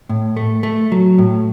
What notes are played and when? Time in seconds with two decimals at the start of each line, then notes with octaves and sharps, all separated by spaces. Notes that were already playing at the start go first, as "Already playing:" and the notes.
0.09 A2
0.37 A3
0.63 A3
0.92 F#3
1.18 A2